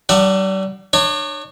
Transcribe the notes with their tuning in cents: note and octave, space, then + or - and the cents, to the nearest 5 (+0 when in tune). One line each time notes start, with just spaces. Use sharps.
G3 -35 D4 +35 F#5 +0
D4 +40 C#5 +0